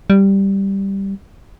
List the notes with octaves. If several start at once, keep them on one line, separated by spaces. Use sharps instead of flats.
G3